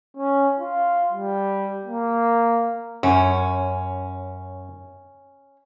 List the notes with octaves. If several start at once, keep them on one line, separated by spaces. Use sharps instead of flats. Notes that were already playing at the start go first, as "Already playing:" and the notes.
C#4
F4
G3
A#3
F#2 C#4